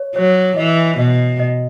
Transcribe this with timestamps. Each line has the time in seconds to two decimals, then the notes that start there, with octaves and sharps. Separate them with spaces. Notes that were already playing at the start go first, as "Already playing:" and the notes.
Already playing: C#5
0.15 F#3 C#5
0.57 E3 D#5
0.98 B2 D#5
1.40 D#5